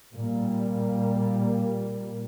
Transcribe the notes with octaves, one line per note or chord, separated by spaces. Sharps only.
A#2 G3 A#3